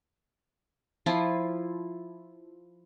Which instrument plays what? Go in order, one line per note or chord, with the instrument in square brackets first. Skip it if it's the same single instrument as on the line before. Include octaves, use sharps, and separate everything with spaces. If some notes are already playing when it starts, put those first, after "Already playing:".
[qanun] F3 E4 F4